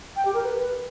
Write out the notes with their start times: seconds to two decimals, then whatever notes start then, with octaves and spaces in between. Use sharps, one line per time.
0.16 G5
0.25 G4
0.34 A#4
0.43 B4